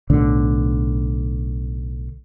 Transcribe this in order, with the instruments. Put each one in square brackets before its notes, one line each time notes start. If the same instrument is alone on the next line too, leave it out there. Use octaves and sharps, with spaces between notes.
[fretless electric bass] B1 A2 D3